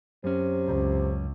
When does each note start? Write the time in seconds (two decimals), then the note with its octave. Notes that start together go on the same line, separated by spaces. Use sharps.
0.24 F#2 C3 C#4
0.66 C#2